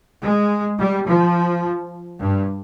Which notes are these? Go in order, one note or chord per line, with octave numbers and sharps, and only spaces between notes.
G#3
G3
F3
G2